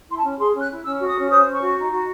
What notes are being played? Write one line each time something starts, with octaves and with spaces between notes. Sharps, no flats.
E4 C6
A5
C#4
G#4 C6
C#4
F#6
E4
C#4 E6
F#4
D#6
C#4
C5 D#6
C#4
C#6
F#4
D#4
F#4